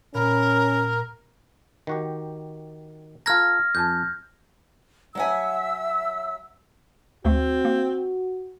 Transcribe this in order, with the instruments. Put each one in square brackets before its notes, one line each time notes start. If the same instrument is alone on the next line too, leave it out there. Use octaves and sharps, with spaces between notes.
[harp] A#2 B5 F6 [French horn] C#4 [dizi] A#4
[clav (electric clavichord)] D#3 F#4 G4
[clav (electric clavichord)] F4 A4 A#5 [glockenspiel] F6 G#6 A#6
[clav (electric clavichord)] F2 G#5 A5 [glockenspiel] G6
[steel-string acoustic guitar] F#3 F#5 G#5 [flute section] E5 E6
[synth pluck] D2 A3 [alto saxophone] C4 [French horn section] F#4
[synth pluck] A#3